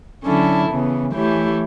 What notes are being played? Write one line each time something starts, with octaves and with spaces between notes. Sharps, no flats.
D3 F#3 C#4 E4 A4
C#3 E3 B3
E3 A3 E4 G4 C#5